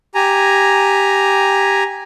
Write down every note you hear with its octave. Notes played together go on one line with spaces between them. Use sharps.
G4 G#5 A#5